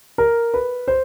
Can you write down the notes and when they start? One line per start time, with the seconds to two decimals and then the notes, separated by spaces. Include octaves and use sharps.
0.18 A#4
0.54 B4
0.88 C5